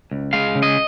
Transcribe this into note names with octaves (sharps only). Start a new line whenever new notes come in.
C#2
G#3 F5
C#3
D#5